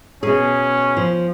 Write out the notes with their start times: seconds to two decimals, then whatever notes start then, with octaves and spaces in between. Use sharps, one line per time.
0.23 B2 C#4 G#4
0.97 F3